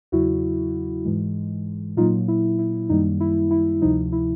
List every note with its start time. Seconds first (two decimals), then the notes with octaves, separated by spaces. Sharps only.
0.12 E2 C#3 F#3 E4 F#4
1.05 G#2 E3 G#3
1.97 A#2 F#3 A#3 D#4 F4
2.28 E4
2.59 E4
2.89 F#2 D#3 G3 A#3 D#4
3.20 E4
3.51 E4
3.82 D2 C3 F3 D#4
4.12 E4